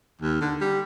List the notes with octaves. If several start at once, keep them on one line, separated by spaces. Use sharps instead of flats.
D#2
D3
G3